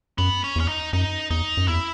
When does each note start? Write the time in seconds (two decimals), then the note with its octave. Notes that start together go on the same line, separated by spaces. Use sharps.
0.18 F#2 B3
0.44 C#4
0.56 E2 C#4
0.68 D#4
0.93 F#2 D#4
1.30 E2 D#4
1.57 F#2
1.68 E2 E4